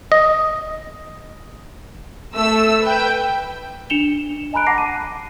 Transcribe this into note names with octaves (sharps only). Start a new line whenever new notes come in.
D#5
A3 E6
B4 G5
D4 C#7 E7 F7 G7
D#5 G#5 A#5 B5 F#6 D7
F#5 A5 D6 A#6 C7
D#7